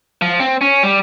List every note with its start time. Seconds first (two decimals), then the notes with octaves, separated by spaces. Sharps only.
0.22 F3
0.40 C4
0.61 C#4
0.83 G3